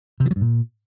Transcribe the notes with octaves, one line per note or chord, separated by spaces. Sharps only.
C3
E3
F#3
G2
A#2